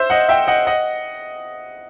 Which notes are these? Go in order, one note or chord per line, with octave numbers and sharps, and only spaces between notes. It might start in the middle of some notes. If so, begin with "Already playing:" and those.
Already playing: C5 E5
D#5 F#5
E5 G5
D#5 F#5
D#5 F#5